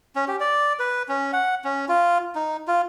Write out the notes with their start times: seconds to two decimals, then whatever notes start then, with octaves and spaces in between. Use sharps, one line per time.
0.16 C#4
0.28 G4
0.40 D5
0.79 B4
1.09 C#4
1.33 F#5
1.64 C#4
1.89 F4
2.35 D#4
2.68 F4